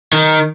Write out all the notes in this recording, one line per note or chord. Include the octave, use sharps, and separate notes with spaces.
D#3